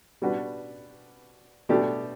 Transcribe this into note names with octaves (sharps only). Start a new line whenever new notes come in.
B2 G3 D4 F#4 B4
B2 A3 D4 G4